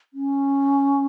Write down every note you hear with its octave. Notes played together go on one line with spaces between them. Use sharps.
C#4